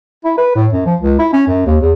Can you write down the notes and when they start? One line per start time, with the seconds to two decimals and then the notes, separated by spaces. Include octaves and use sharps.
0.25 E4
0.38 B4
0.55 A2
0.73 F#2
0.86 F3
1.01 C#2
1.19 E4
1.33 C#4
1.47 F#2
1.66 D#2
1.81 E2